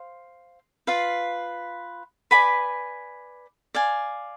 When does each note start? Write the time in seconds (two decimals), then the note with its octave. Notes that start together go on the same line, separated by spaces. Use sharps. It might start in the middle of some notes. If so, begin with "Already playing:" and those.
Already playing: C5 F5
0.87 F4 B4 F5
2.31 B4 D5 G#5 B5
3.74 D5 F5 G#5